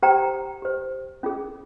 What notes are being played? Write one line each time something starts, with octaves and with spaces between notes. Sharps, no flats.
G4 C5 G5 A#5
G4 C5
C#4 F4 G#4